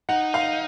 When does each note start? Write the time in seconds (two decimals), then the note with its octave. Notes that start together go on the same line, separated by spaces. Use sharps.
0.09 D#4 F#5
0.34 F5